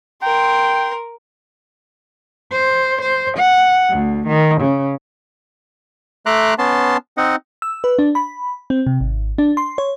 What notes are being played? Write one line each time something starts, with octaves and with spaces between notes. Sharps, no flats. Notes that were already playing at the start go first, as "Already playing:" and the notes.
A#4 G5 C6
C5
C5
F#5
D2
D#3
C#3
A3 E5 A#5 C6 D6 F#6
B3 C#4 A5 C6
C4 D#4 D#5 F#5
E6
B4
D4
B5
C4
C3
G#1
D4
C6
C#5